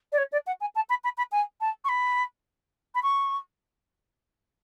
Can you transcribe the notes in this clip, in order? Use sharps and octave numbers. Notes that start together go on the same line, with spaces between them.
D5
C#5
D5
F#5
G#5
A5
B5
B5
B5
G#5
A5
C#6
B5
B5
C#6